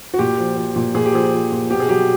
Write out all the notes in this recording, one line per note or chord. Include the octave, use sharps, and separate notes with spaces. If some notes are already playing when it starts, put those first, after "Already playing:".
F#4
A#2 G4
F3
F3
A#2
A#2 G#4
G4
F3 G#4
F3
A#2
B2 G4
G#4
F#3 G4